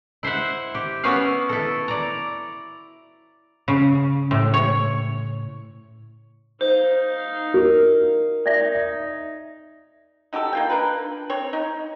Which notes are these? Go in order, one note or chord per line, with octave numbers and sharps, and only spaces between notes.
E4 C5 E5 F#5
G4
B3 C#4 E4 F#4 B4 F5
E4 A4
D5 A#5
C#3
A2
C#5
D#4 C5 F5
A#4
D#4 D5 E5
D#4 F#4 G4 A4
A#3 F4 G5
D4 A#4 B4
C4 C#5
D#4